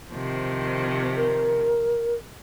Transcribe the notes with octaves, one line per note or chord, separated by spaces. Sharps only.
C3 D#3 F3
A#4